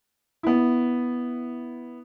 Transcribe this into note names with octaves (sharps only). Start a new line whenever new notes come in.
B3 E4